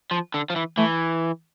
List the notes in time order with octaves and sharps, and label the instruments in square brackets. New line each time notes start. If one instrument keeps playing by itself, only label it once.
[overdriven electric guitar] F3
D3
F3
E3
[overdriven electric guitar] E3 [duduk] A3